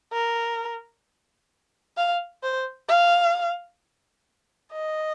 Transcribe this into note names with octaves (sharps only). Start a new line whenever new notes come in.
A#4
F5
C5
F5
D#5